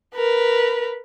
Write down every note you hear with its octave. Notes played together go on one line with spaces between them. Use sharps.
A#4 B4